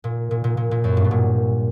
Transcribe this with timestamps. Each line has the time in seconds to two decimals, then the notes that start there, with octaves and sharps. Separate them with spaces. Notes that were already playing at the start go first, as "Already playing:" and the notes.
0.04 A#2
0.31 A#2
0.44 A#2
0.57 A#2
0.71 A#2
0.84 F#2
0.97 G2
1.04 B2
1.11 A#2